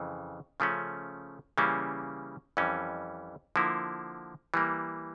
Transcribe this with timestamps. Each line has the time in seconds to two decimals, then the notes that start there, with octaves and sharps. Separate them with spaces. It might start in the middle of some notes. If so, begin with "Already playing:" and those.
Already playing: F2 C#3 E3
0.60 C#3 F3 A3 C#4
1.58 C#3 E3 G3 A#3 C#4
2.57 F2 E3 G3 C#4
3.56 D3 F3 A#3 E4
4.54 E3 G3 A#3